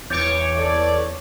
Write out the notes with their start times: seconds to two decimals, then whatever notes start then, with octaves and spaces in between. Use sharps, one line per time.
0.10 E2 C#5 D6 G6 A6 D7
0.58 A4 D5